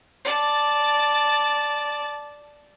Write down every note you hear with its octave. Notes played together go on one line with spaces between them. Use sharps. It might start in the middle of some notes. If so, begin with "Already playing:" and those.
D5 A5